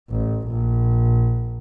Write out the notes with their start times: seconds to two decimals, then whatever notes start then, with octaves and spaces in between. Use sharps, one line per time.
0.10 A1
0.48 A#1